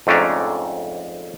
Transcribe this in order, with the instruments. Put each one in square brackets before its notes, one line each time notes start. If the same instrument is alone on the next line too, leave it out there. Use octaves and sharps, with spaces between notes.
[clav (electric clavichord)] F2 G#2 A3 C#4 D4 A#5